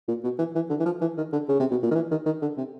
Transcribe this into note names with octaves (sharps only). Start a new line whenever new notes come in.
A#2
B2
E3
E3
D3
E3
F3
E3
D#3
D3
C#3
C3
B2
A#2
D#3
E3
D#3
D#3
D3
C3